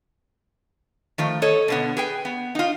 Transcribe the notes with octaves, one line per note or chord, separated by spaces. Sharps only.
D#3 F3 A3
A4 C#5 D#5
B2 D3 B3
G#4 B4 G5
B3
D#4 F4